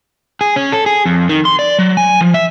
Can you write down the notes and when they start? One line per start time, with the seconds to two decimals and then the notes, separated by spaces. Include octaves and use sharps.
0.41 G#4
0.56 C#4
0.72 A4
0.86 G#4
1.06 F2
1.29 D#3
1.45 C6
1.59 D5
1.79 F#3
1.97 G#5
2.21 F3
2.34 E5